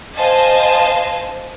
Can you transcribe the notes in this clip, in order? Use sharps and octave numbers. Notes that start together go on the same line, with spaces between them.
C5 D#5 F5 G#5 A5